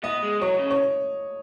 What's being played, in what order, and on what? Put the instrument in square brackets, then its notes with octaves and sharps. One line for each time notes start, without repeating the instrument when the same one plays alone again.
[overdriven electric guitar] B3 [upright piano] D#5
[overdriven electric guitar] G#3
[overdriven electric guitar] F#3 [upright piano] C#5
[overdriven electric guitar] C#3
[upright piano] C#5